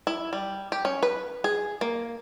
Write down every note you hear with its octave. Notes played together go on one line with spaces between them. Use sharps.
E4
G3
G4
C#4
B4
G#4
A#3